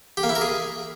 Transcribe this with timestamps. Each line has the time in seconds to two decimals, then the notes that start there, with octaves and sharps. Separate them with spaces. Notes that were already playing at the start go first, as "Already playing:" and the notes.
0.17 G4
0.23 A#3
0.29 E4
0.35 A#4
0.41 G#4